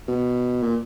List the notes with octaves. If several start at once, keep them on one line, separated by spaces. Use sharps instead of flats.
B2
A#2